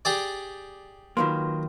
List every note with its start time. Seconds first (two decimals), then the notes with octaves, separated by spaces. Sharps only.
0.05 G4 G#4 D5
1.17 D#3 F#3 A#3 F4 B4 C6